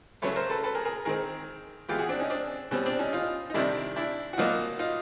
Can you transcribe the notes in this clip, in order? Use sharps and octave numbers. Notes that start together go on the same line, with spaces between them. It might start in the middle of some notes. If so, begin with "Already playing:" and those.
C#3 F#3 A3 B4 C#5
A#4 C5
A4 B4
A4 B4
G#4 A#4
G#4 A#4
D#3 G#3 C4 G#4 A#4
E3 G#3 B3 F4 G4
F#4 G#4
C4 D4
C#4 D#4
C4 D4
B2 G3 C4 C#4
C4 D4
C#4 D#4
D#4 F4
D#4
C3 D#3 G3 D4 E4
D4 E4
F#4
B2 F#3 A#3 D#4 F4
D#4 F4